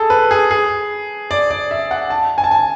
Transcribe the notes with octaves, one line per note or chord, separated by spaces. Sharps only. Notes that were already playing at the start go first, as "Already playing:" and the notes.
Already playing: G#4 A4
B4
G#4
G#4
D5
D5
E5
F#5
A5
G#5
A5
G#5